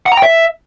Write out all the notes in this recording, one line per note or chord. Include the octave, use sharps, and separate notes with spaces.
F#5
A#5
G5
E5